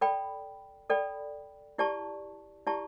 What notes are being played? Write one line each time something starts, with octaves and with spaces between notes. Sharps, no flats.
A4 D5 G5 B5
A4 D5 G5 B5
E4 G4 D5 A5 C#6
E4 G4 D5 A5 C#6